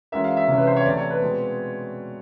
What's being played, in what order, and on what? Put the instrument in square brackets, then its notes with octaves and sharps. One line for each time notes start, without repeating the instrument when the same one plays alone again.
[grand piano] E3 G#3 C#4 F#4 A#4 [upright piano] E5
[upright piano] F5
E5
[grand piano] C3 E3 G#3 C#4
[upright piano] B4
C5
C#5
[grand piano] C3 E3 A3 C4 E4 [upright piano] D5
[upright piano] C#5
B4
[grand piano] B2 G#3 C4